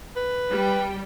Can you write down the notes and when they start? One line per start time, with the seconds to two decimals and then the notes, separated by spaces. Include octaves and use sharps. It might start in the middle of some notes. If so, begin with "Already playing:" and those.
0.16 B4
0.49 G3 G5